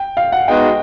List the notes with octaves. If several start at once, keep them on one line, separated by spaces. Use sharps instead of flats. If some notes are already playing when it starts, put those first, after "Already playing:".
Already playing: G5
F5
F#5
G#3 B3 D#4 F#4 G5